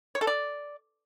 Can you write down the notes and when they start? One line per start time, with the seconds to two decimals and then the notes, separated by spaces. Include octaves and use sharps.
0.15 C#5
0.21 A4
0.27 D5